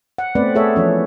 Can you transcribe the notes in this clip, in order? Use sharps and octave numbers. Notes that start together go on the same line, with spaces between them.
F#5
A3 B3 C4 B4 D5
A3 G#4 A4 C#5 E5
E3 F3 C#4